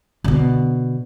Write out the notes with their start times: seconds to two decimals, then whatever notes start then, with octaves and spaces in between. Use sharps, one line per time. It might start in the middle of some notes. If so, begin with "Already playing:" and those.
0.24 B2 D3